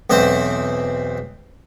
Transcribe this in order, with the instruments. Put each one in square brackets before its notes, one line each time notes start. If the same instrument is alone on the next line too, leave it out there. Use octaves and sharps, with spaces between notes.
[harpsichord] B1 E2 C4 C5